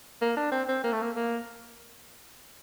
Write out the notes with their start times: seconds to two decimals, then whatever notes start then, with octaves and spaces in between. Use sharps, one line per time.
0.22 A#3
0.37 D4
0.52 C4
0.69 C4
0.84 A#3
0.93 A3
1.02 A#3
1.16 A#3